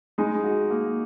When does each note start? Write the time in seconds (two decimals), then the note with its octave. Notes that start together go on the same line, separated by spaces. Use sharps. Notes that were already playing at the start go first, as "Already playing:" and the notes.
0.18 G#3 D#4
0.44 F#4
0.70 A#3